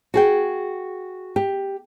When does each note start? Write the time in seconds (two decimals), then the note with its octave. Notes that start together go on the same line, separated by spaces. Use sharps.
0.14 F#4 G#4 G5
1.36 G4